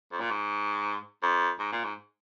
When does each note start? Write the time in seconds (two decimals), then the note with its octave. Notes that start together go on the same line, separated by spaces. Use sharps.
0.12 F2
0.20 A#2
0.30 G#2
1.23 F2
1.59 G#2
1.72 A#2
1.84 G#2